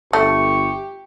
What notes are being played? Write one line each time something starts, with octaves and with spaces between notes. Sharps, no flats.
G1 A3 G4 C#6